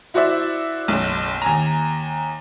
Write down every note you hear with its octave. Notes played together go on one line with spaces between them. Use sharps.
E4 F#4 C5 D5 E5
F#1 B1
D#2 G#5 A#5